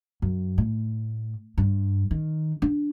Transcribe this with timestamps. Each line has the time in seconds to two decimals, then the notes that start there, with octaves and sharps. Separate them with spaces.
0.22 F#2
0.58 A2
1.58 G2
2.11 D#3
2.62 D4